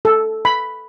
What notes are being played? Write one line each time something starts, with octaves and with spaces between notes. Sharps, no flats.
A4
B5